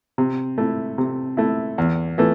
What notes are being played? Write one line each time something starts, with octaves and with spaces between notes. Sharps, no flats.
C3
A3 E4
C3
A3 E4
E2
E3 A3